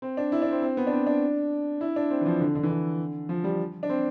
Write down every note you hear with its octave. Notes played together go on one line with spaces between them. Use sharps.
C4
D4
E4
D4
C4
C4
B3
D4
C4
D4
E4
D4
C4
E3
F3
D3
D3
E3
D3
F3
G3
D4
C4